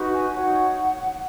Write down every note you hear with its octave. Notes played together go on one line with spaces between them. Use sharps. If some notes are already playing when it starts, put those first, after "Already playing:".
Already playing: D#4 F#4 B4
G#5
D#4 F#4 C#5 F#5